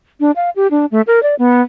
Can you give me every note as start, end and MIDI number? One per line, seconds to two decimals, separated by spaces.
0.20 0.31 62
0.36 0.50 77
0.56 0.67 67
0.71 0.86 62
0.92 1.02 57
1.07 1.22 70
1.23 1.35 74
1.39 1.62 59